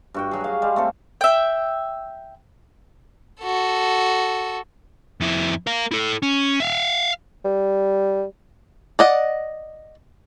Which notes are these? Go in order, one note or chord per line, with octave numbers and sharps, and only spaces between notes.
G2 F#4 G5
F#3 G#4
F5
G3 G#3
A3 C4 A4
E5 G5
F#4 A4
F2 E4
A#4 F5
E4 A4
C#4
E5 F5
G3
D5 D#5 F#5